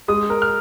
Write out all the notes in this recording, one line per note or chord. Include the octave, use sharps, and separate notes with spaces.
G#3 D#6
A#4
F6